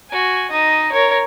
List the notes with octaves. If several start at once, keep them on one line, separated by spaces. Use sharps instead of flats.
F#4 G#5
D#4 D#5
A#4 C#5